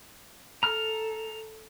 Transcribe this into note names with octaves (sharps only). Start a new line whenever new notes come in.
A4 A#5 F6